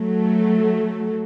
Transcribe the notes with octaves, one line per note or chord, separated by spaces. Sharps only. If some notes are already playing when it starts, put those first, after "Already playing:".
Already playing: F#3 A3